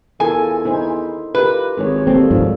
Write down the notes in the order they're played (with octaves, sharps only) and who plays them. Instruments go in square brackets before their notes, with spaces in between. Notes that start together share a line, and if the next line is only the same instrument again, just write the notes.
[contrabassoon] E2 [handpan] F4 A4 A#4 [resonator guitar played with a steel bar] G#5
[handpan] D#4 E4 C5
[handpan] F4 G4 A#4 [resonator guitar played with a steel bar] B4
[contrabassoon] G#1 [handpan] G#4 C#5
[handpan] G3 A#3 A4 [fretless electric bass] C4
[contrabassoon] G#1 [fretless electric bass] G#2 F3